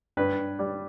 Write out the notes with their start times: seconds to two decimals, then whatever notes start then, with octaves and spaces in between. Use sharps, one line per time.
0.17 G2 B4
0.59 G3